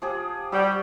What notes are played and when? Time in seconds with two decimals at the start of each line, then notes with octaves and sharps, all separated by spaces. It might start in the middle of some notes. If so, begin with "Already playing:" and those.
0.02 F3 G4 G#4
0.52 G3 F#4